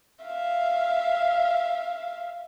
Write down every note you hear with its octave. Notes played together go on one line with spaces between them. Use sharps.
E5 F5